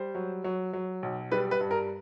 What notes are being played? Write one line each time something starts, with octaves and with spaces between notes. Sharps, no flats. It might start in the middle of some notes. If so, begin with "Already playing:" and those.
Already playing: G3 C5
F#3
F#3
F#3
B1
G3 B4
B4
G2
A#4